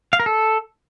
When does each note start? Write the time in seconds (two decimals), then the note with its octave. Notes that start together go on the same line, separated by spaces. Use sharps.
0.13 F5
0.20 A#4
0.26 A4